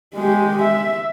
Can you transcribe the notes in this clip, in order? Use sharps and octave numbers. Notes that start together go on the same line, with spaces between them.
G#3 G4
E5